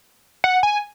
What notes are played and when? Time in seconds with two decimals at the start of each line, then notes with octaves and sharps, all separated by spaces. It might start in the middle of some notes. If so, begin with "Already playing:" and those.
0.44 F#5
0.63 G#5